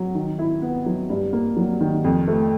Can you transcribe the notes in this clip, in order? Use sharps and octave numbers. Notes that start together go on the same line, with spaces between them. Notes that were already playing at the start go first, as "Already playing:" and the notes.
Already playing: F#3
D#3
E4
B3
F#3
G2
A#3
F#3
D#3
F2
A3